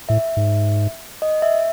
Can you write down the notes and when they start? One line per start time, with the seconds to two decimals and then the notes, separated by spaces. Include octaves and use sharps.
0.09 A2 E5
0.37 G#2
1.22 D#5
1.42 E5